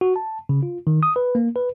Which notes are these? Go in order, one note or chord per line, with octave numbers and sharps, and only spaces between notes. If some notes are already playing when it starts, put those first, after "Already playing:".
F#4
A5
C#3
F4
D#3
D#6
B4
A#3
B4